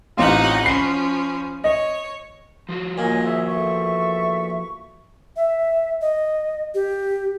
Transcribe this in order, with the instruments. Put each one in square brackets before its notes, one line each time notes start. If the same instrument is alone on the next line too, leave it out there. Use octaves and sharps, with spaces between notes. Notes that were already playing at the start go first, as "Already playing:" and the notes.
[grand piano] A1 C4 F4 [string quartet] D#4 G4 F#5
[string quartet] F3 C#4 [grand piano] B5 C7
[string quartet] C#5 [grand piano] D#5
[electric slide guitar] F3 F4 F#4
[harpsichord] A#2 [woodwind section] C#5 D#5 G#5
[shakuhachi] G#4 [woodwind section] C5 C#5 E5
[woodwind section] E2 A4 C#6 [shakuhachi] E5
[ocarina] E5
D#5
G4